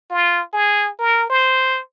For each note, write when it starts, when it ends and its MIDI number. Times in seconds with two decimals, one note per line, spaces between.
0.11 0.42 65
0.53 0.90 68
0.99 1.28 70
1.30 1.80 72